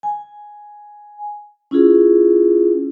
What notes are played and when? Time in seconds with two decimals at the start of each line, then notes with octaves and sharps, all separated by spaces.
0.03 G#5
1.71 C#4 E4 F4 G#4